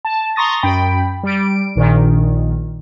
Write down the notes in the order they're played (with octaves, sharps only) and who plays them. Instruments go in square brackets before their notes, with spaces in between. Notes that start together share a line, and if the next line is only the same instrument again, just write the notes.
[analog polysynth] A5
A#5 C6 C#6 D#6 A6 A#6
F#2 G5 B5
G3 D7
A#1 A#2 D#3